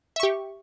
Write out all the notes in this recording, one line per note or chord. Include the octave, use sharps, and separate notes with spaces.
G4 E5 C#6